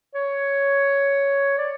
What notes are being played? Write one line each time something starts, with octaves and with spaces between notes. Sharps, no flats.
C#5
D5